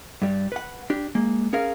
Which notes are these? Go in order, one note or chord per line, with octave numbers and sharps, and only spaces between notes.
G2 G3
B4 F#5
D4 G4
G#3 A#3
C#4 G#4 A#4 F5